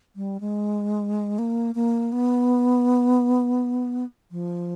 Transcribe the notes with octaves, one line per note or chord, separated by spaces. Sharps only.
G3
G#3
A#3
A#3
B3
F3